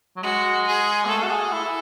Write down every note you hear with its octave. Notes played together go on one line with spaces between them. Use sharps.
F#3
G#3 F#4
G#4
B3
A3 A4
F#4
G#4
E4
E4